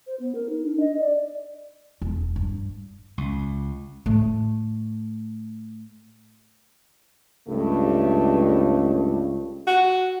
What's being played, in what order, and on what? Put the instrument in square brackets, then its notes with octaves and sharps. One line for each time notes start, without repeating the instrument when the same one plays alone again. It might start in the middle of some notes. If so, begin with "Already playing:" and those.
[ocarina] C5
B3
A#4
D#4
D4
D#5
D5
[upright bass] E1
G2
[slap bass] C#2
[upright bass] A2 A3
[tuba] C#2 [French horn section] G2 A3
[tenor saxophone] F#4